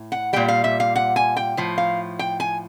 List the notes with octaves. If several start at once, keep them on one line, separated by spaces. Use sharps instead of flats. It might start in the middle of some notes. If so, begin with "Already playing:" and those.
Already playing: A2
F#5
A#2 G3 G5
F5
E5
F5
F#5
G#5
G5
A2 F3
F5
G5
G#5